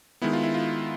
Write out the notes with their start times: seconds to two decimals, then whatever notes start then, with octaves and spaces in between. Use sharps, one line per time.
0.22 D#3 G#3 B3 E4
0.33 F4
0.43 E4
0.54 F4